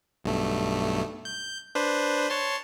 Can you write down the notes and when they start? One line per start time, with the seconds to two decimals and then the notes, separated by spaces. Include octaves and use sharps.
0.24 B1 G2 A3
1.25 G6
1.75 D4 B4 C5
2.30 C#5 A5 C6